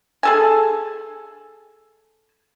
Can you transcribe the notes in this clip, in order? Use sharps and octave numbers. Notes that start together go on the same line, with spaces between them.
G#4 A4 G#5